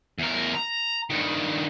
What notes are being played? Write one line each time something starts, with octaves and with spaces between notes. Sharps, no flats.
E2 A#4
A#5
G2 D#3